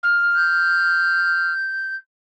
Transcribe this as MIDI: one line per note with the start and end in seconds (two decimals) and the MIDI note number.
0.03 1.53 89
0.35 1.95 91